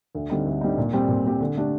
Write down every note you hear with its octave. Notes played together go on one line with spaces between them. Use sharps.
D2
D3 G3 C4 D#4
D2
D3 G3 C4 D#4
A#2
G3 C4 G4
A#2
G3 C4 G4
D3
A3 D4 G4